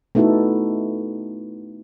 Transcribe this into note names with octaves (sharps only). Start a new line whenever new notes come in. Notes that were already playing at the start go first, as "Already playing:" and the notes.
A3 B3 D#4 E4 F#4 A4